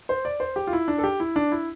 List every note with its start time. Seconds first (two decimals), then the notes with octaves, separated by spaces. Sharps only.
0.09 C5
0.25 D5
0.40 C5
0.56 G4
0.67 F4
0.73 E4
0.88 D4
0.98 A4
1.04 G4
1.20 E4
1.36 D4
1.52 E4